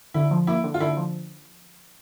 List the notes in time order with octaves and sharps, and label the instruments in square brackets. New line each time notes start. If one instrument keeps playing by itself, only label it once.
[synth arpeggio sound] D3 [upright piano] E4
[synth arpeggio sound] F3
[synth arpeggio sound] A#3 [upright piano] E4
[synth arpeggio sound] D3
[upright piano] F4
[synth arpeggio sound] D3 [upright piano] E4
[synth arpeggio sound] F3